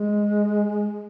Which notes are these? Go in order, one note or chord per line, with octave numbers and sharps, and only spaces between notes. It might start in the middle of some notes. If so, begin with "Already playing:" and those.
Already playing: G#3